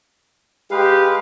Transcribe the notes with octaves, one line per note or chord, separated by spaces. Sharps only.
G#3 G4 B4 F5